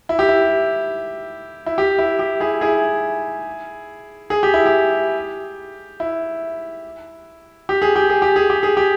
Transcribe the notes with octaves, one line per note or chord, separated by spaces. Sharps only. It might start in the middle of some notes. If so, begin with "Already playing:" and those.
E4
G4
E4
E4
G4
E4
G4
E4 G#4
E4 G#4
G#4
G4
E4
G4
E4
G4
G#4
G4
G#4
G4
G#4
G4
G#4
G4